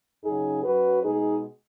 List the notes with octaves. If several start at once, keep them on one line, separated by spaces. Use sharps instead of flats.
F#2 C#3 F#3 D#4 G#4
F#2 F#3 F#4 B4
B2 G#3 D#4 G#4